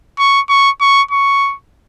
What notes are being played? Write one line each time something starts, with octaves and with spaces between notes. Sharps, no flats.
C#6
C#6
C#6
C#6